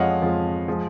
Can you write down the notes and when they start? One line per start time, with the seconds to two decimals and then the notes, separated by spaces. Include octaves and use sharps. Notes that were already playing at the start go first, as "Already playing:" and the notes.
Already playing: F2 F3 G#3 C#5 D#5 F5 F#5
0.21 F2 F3 G#3
0.68 F3 G#3